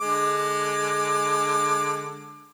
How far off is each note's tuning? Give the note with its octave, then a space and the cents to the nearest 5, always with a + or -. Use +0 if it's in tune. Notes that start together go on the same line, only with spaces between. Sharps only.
D3 +0 G#3 +0 D6 +25